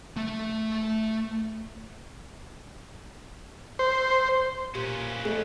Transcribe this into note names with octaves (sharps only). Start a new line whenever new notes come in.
A3 E5
C5
A#2 C#4 G4 B4
F2 A3